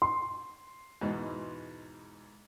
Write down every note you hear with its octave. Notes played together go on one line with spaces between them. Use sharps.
C6
E2 G#2 B2